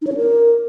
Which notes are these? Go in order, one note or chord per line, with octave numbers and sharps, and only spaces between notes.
D#4
C#5
C#4
A#4